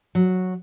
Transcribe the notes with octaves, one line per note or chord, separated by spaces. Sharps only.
F#3